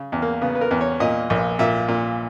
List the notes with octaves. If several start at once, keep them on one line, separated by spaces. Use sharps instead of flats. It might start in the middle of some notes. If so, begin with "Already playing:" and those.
Already playing: C#3
E2
A#3
C#3 B3
B4
A#4
E2
C#5
A#2 D#5
A#1
A#2 E5
A#2